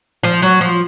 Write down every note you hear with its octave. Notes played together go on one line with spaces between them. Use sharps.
F3
F#3
F3